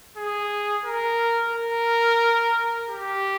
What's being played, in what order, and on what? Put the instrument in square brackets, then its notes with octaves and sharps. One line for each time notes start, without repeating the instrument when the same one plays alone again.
[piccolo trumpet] G#4
A#4
A#4
G4